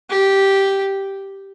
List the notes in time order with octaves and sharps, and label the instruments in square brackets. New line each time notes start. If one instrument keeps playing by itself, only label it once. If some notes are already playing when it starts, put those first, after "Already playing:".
[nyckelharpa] G4